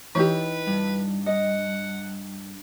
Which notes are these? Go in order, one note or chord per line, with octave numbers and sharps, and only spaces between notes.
E3 D#4 E4 G4 B4
G2
D#5 F#5